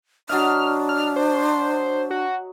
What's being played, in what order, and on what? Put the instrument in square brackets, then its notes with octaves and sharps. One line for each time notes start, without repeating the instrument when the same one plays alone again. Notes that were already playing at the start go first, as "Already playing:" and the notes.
[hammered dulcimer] F#3 D#5 E5 [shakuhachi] D4 [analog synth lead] F6
[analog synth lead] F6
C5
F#4